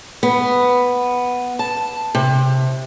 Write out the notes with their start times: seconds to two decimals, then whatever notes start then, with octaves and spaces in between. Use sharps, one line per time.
0.23 B3
1.59 A5
2.15 C3